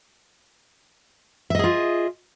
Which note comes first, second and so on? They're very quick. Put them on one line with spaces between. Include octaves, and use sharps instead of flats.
E5 D#5 G#4 F4